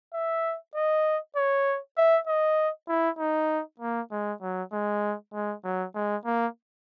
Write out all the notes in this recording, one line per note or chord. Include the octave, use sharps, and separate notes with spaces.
E5
D#5
C#5
E5
D#5
E4
D#4
A#3
G#3
F#3
G#3
G#3
F#3
G#3
A#3